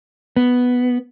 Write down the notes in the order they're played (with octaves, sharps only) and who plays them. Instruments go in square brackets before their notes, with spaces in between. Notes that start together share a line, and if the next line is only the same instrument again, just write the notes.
[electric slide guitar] B3